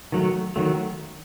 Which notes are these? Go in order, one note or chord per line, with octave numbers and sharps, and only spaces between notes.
D#3 F#3 A3
D#3 F#3 A3